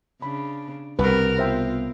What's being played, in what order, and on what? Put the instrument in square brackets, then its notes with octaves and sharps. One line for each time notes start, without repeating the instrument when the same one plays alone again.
[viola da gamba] C#3 D4 [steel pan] B5
[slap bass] C2 B2 [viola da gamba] G3 C4 A#4 [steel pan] B4
[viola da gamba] B3 F4 [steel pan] C5 E5 G5